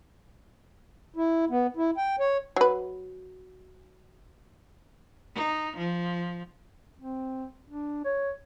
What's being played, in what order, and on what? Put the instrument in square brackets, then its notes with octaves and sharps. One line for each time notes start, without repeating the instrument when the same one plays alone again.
[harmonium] E4
B3
E4
G5
C#5
[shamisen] F#3 B4
[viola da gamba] D#4
F3
[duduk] C4
D4
C#5